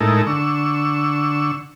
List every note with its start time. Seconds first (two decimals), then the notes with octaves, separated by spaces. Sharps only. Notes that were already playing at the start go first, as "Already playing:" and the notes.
0.01 A2 G#3 D#4 E4 A4 A#4
0.27 D3 C#6 E6